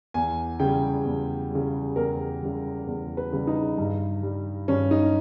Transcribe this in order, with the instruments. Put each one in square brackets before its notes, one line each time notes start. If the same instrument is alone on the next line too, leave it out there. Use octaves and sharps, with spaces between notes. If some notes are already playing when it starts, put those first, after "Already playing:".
[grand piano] E2 G#5
C#3 G3 G5
E2
C#3 G3
E2 A#4
C#3 G3
E2
B4
C#3 G3
D#4
G2
G3
G2 C#4
D#4